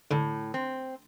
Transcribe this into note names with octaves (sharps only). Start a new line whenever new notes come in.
A2 D3
C4